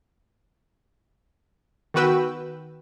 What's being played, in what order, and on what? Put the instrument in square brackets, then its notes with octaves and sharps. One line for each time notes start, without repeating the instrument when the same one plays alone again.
[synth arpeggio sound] D#3 B3 F#4 B4 G5 E6